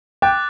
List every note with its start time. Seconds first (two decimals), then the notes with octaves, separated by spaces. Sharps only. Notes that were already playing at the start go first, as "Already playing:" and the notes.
0.22 G5 D6 F#6 A6